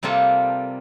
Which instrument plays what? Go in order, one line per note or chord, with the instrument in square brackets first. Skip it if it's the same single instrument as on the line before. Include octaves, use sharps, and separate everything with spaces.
[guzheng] C3 G3 A#3 F4 A4